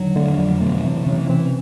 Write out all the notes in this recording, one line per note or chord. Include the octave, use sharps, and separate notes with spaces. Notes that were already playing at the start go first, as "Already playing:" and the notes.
Already playing: E2 D3 D#3 F#3
D3 A3
F2 F3 F#3
B2 A3 B3
C3 E3 C4
C#3 E3 C#4
C3 E3 C4